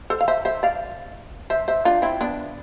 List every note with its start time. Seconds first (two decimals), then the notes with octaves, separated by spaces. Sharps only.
0.10 A4 C5
0.21 F5
0.28 C5 E5
0.45 C5 E5
0.63 D5 F5
1.50 C5 E5
1.68 C5 E5
1.85 D4 F4
2.02 C4 E4
2.21 B3 D4